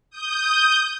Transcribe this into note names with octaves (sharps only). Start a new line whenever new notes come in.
D#6 G6